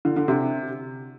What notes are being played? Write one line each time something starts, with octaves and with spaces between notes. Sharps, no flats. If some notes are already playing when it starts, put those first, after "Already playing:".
D3
D3
C3